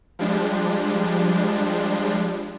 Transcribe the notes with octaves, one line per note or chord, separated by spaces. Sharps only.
F3 G3 G#3 D4